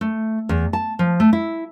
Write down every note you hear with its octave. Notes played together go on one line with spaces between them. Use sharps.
A3
E2
A5
F3
A3
E4